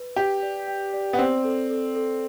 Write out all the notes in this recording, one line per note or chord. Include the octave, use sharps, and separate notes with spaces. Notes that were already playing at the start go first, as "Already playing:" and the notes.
Already playing: B4
G4 G5
D5
G5
D5
B3
C4 D5
A4
A4
A4